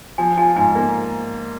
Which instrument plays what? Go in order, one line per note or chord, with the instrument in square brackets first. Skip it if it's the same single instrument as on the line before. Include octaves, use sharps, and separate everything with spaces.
[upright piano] F3 [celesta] G#5
[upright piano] F4 [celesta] G#5
[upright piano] G#2 [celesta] G#5
[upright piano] A#3